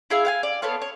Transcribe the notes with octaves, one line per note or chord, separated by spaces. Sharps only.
E4 G#4 E5 F5
F5 F#5 G#5
D5
B3 A4 C#5 F5
C#5